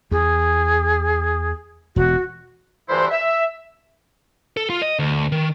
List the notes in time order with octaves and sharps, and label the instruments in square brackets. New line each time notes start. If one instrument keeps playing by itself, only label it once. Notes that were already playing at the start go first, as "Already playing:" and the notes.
[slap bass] E2 [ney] G#4
[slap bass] E1 [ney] F#4
[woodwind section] D2 G2 E3 D4 E4 C5
E5
[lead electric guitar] A4
F4
D#5
D2
D#3